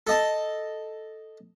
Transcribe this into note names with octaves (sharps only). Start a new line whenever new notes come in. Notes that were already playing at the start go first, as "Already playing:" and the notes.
A4 D#5 A5